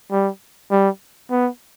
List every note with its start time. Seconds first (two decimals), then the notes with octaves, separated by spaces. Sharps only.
0.12 G3
0.71 G3
1.31 B3